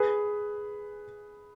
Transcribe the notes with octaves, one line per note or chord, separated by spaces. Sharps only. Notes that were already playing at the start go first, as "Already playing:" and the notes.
Already playing: G#4 B4